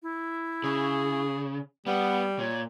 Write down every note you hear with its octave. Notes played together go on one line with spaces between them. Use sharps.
E4
C#3 G#4
G3 B3 F#5
A#2 C#5